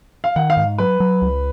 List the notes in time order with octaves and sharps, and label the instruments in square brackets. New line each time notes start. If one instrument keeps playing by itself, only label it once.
[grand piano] F5
[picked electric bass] D#3 [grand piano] F#5
[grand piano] F5
[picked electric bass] G#2
[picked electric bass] F#3 [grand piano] B4
[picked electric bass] F#3
C#2